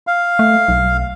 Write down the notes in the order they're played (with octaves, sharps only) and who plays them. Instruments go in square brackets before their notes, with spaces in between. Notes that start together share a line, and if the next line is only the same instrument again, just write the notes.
[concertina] F5
[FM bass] A3
B1